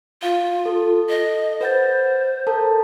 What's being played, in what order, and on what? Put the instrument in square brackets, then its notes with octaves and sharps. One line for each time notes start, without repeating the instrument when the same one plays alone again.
[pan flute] F4 [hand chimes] F5
[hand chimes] A4
[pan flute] D#5
[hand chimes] B4 F#5 A6 [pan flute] C5
[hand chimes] A4 A#4 A5